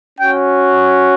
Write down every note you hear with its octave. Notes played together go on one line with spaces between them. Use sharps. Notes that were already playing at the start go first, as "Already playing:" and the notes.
C#4 F#4 G5